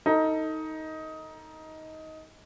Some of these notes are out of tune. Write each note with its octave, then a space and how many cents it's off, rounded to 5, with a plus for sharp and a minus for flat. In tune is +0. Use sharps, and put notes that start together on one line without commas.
D#4 +15 A4 +30